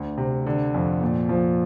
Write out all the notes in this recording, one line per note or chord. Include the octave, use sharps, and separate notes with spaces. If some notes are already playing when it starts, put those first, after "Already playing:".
Already playing: D2
C3
D3
F2
A#2
F3